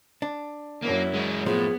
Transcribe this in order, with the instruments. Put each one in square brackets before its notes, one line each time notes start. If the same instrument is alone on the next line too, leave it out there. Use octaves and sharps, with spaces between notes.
[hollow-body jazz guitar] D4
[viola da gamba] F#2 C#4 E4 [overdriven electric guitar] A#3
[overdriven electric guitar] G#3 F#4
[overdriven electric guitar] A2 [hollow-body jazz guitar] F3 [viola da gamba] A#3 B3 [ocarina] G#4